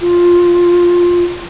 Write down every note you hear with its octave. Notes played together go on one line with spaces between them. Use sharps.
F4